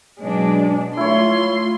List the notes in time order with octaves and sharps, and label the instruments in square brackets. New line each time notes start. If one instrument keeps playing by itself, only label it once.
[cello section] B2 F#3 D4 [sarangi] G#3
[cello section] A3 F4 [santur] E4 C#5 [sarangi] C6